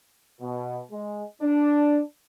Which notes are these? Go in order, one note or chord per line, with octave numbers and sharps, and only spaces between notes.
B2
G#3
D4